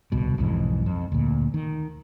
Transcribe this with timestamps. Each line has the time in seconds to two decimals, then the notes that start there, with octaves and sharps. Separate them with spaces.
0.12 D1 C2 B2
0.38 B1 F2 G#2 E3
0.86 F2
1.12 D2 A#2
1.54 D#3